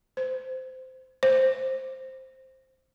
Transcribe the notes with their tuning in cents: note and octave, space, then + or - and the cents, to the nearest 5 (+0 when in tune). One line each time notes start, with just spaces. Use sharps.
C5 -15
C5 +10